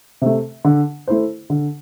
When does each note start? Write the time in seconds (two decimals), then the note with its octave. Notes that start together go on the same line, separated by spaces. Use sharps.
0.22 C3 A3
0.65 D3
1.07 A3 E4 C5
1.50 D3